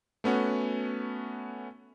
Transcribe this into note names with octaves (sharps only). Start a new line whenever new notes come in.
A3 B3 C#4 F#4